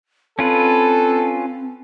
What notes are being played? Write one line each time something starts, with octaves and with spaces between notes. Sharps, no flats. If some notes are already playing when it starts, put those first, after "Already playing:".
C4 C#4 F4 A4 B4